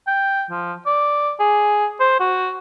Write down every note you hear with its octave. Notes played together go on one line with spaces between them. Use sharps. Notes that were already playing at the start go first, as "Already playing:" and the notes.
G5
F3
D5
G#4
C5
F#4